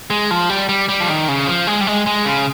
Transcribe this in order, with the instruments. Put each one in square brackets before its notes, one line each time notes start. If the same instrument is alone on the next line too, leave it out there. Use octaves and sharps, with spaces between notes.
[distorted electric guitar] G#3
F3
G3
G3
G3
F3
D#3
C#3
F3
G#3
G3
G#3
G#3
C#3